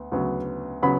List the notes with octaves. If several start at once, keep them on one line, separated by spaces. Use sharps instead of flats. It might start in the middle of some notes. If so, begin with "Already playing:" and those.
Already playing: D2 B3
D2 C#3 F#3 B3
C#3 F#3 B3 B5